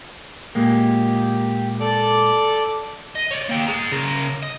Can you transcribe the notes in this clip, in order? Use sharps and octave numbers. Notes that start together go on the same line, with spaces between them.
A#2 G#3 A#3 G4
A4 D5 D6
D#5
C#5 D5
A#3 G5
G#4 A#5
C#3 A#4
D#5